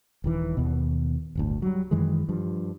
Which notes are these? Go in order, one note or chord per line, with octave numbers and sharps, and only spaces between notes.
D#1 D#3 E3
D#2 B2
D1 G1 D2
F#3 G3
F#2 D#3 E3 G#3
G2 F3